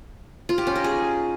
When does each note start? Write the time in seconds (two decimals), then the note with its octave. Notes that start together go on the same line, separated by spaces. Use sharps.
0.49 F4
0.58 G4
0.67 C#4
0.76 D#4
0.84 G#4